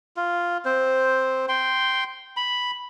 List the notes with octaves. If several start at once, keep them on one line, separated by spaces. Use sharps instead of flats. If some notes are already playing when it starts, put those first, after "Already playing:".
F4
C4 C5
G5 C6
B5